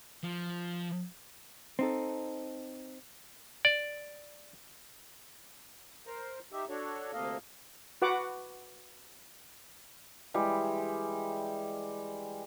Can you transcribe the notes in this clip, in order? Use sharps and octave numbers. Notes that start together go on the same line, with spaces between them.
F3
C4 D#4 A4
D5
A#4 C5 A#5
D#4 G4 E5
D4 F#4 A4 C#5
D2 C3 A#3 A4 D#5 F5
F#4 B4 F#5 D6
E3 G3 G#3